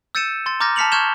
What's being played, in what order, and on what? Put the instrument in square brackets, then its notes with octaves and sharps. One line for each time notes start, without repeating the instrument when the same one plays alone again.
[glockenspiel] E6 G6 A6 C#7 D#7 E7
C6 A6
A#5 D6 F6 G6 A6 A#6
A5 F6 B6 C#7 F7 F#7
C#6 F6 G6 G#6 E7 G7